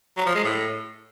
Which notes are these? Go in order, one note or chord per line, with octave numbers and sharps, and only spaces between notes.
F#3
F3
G#3
A2